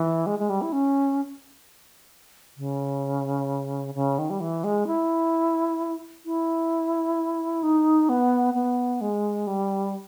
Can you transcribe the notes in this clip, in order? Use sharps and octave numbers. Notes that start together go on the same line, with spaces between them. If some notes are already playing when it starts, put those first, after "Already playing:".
Already playing: E3
G#3
G#3
G3
E4
C#4
C#3
C#3
D#3
G3
E3
G#3
E4
E4
D#4
B3
B3
G#3
G3